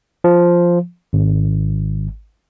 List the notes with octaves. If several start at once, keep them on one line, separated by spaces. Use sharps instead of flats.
F3
G#1